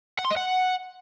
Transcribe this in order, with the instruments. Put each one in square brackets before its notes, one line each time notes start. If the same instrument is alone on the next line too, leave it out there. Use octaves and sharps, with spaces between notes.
[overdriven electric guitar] F#5
C6
D#5
F#5